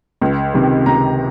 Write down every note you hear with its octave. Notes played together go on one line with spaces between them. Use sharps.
C#2
C3 D#3
C#2 A#5